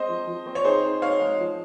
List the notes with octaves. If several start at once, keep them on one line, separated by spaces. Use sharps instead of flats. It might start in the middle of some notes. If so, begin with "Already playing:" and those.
Already playing: G#3 C4 C5 D#5
F3
F3
C4
C#5
D#4 G#4 C5
D#4
D#4 C#5 F5
G#3
F3